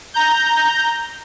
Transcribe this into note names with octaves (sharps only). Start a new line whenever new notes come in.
A#5 G6